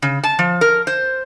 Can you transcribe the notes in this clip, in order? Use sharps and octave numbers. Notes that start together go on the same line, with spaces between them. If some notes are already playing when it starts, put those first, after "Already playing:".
C#3
A5
F3
A#4
C5